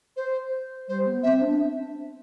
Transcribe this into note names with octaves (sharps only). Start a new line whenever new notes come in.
C5
G3 C5
B3
C4 E5
D4